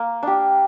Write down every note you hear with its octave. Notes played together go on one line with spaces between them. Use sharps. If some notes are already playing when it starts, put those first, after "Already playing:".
Already playing: A#3
D4 G4